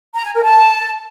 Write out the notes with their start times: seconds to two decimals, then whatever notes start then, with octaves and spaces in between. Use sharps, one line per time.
0.14 A#5
0.24 G#5
0.34 A#4
0.44 A5